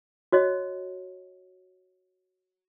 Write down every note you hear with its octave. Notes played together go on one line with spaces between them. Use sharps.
F#4 C#5 D#5